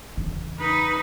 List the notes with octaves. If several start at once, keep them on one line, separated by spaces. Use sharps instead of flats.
E2 C#3
D#4 B4